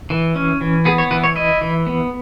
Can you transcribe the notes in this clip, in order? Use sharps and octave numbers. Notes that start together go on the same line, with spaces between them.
E3
C#4
E3
B3 G#4
C#5
E3 B4
C#5
E4 D#5
E3
B3